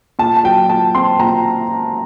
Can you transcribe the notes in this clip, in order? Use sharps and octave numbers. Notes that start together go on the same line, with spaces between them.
A#2 A5
A5
F#3 G5
A#2 A5
C4 C6
A#2 A#5